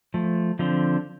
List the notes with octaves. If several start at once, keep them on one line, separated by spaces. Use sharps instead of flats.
F3 A3
D3 F3 C4